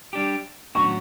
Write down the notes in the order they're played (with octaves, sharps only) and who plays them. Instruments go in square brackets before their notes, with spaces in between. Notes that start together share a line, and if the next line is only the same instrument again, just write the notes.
[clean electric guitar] G3 D4 G4
[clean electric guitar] A2 F#3 C#4 F#4 [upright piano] C#6